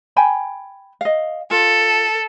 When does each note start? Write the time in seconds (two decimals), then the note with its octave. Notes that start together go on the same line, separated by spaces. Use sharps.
0.16 G5 G#5 B5
1.01 D#5 F5
1.51 F4 A4